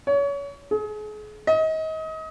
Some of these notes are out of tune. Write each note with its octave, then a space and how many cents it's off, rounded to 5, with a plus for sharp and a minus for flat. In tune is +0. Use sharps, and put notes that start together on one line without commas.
C#5 +30
G#4 +35
D#5 +30